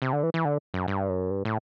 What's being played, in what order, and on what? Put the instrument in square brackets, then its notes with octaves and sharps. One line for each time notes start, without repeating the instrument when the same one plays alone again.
[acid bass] C3
D3
E3
E3
D3
F#2
G2
F#2
G2
A2